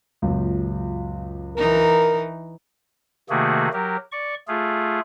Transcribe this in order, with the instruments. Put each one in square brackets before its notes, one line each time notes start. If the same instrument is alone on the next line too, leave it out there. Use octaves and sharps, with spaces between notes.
[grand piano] C#2 F#2 A#2
[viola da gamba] E3 D#4 [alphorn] A#4
[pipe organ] C3 D#3 A3 A#3 F#4 G#4
F#3 G4 A#4
D5 C#6
A3 F4 G#4